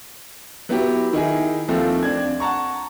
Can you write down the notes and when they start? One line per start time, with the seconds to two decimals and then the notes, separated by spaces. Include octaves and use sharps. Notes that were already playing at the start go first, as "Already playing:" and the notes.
0.69 F#3 B3 E4 G4
1.13 D#3 D#4 E4 G#4
1.68 D#2 F3 A3 C4
2.03 C4 D4 G#6
2.40 F#5 A5 A#5 C#6